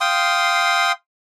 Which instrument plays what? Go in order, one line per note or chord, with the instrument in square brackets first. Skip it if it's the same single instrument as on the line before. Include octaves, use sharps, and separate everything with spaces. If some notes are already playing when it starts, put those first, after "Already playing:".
[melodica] F5 G5 C6 D#6